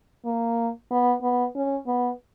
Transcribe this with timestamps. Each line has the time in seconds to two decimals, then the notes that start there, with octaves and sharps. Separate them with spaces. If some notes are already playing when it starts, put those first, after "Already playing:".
0.25 A#3
0.91 B3
1.22 B3
1.55 C#4
1.87 B3